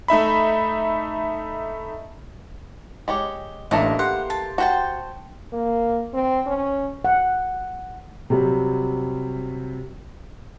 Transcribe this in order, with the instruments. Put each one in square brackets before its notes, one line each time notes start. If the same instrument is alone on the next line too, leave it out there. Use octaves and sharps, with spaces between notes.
[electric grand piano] A3 D#4 E5 B5
[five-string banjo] G#3 G4 C#5
[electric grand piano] A1 D4 [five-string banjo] E3 A3 A#3 [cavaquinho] D#5
[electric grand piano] G4 C6 [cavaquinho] F#5
[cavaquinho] A5
[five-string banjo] F#4 [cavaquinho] C5 G5 A5
[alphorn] A#3
C4
C#4
[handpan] F#5
[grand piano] C3 F#3 G3